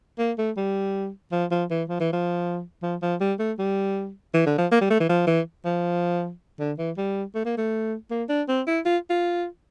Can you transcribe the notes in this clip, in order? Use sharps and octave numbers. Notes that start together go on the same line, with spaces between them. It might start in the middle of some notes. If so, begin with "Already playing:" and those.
A#3
A3
G3
F3
F3
E3
F3
E3
F3
F3
F3
G3
A3
G3
E3
D3
F3
A#3
G3
A3
E3
F3
E3
F3
D3
E3
G3
A3
A#3
A3
A#3
D4
C4
E4
F4
F4